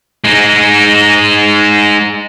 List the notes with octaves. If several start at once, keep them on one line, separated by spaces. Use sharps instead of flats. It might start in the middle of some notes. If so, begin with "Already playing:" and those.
G#3 D#4